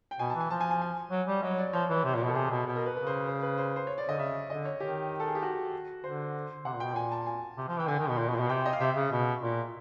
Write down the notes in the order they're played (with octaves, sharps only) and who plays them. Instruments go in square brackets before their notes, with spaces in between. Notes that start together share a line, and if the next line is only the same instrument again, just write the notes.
[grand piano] G5
[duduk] B2 [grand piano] G#5
[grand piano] A5
[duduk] E3
[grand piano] G#5
[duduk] F3 [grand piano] A5
[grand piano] G#5
G#5
G#5
[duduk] F#3
G3
[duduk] F#3 [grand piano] D#5
[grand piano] C#5
D5
[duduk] F3 [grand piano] C#5
[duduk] E3
C3
A#2
B2
[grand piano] A4
[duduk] C3 [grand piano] G#4
[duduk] B2
B2
[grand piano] A#4
B4
[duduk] C#3 [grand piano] B4
[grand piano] C5
C5
B4
C5
C5
C#5
D5
[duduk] D3 [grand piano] D#5
[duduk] C#3 [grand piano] E5
[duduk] D3 [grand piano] D#5
[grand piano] C#5
[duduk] D#3 [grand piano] G4
[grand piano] A4
G#4
G4
F#4
[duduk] D3 [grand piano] C5
[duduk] C3 [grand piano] F#5
[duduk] A#2
[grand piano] G5
[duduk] B2
[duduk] A#2 [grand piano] G#5
[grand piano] A5
G#5
[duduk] C3
F3
[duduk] E3 [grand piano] G5
[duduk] D3 [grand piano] G#5
[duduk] D#3
B2
A#2
B2
A#2
B2
[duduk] C3 [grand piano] G5
[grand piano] D#5
F5
[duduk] C3 [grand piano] E5
[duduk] C#3
B2
A#2